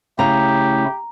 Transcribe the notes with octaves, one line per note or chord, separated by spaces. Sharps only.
C#3 A3 E4 G4 A#5